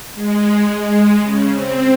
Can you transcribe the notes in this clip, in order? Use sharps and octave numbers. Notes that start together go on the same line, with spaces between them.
G#3
C#3
C4